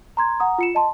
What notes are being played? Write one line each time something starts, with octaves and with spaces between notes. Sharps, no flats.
A#5 C6 G#6
F#5 A#5 D#6
F4 C#7 E7
D#5 A5 C6